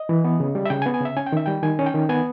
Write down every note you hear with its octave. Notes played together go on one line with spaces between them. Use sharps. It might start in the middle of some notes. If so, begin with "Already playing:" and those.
Already playing: D#5
E3
B3
C#3
G3
E5
C#3 G5
G#5
B3
G#5
C#3 E5
C#4 G#5
G5
D#3 E5
G3 G5
D#3 G#5
C#4
G5
D#3
B3 G#5